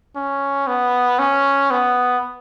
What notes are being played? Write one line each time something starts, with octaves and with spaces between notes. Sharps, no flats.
C#4
B3
C#4
B3